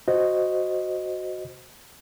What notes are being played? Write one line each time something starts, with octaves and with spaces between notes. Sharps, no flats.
F#4 C5 D#5